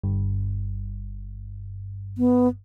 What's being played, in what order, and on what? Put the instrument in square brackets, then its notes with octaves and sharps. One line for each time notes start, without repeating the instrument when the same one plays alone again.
[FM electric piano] G1 G2
[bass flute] B3